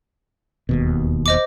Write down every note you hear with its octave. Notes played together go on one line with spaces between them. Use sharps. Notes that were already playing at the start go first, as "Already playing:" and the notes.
E1 D#2 B2
C5 D#5 D6